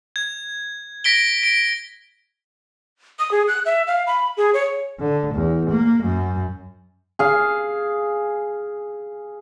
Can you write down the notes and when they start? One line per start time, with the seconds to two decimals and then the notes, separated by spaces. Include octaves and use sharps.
0.16 G#6
1.04 A#6 B6 D7 G7
1.43 D7
3.19 D#6
3.31 G#4
3.48 F#6
3.65 E5
3.87 F5
4.07 B5
4.37 G#4
4.54 C#5
5.00 D3
5.34 E2
5.70 A#3
6.03 F#2
7.19 G#4 F5